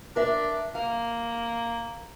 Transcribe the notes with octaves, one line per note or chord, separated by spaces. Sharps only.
D4 A#4 E5
A#3 F5